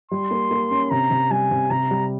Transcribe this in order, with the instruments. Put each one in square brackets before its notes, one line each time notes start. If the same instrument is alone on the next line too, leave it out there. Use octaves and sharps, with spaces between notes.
[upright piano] G3 [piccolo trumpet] C6
[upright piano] A#3
A#3
C#4
[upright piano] C3 [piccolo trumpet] A#5
[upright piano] C3
[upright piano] G3 [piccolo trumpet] G#5
[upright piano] C3
[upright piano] C3 [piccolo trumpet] A#5
[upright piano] G3